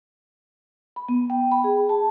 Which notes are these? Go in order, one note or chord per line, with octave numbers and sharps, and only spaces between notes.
B5
B3
G5
B5
G#4
A5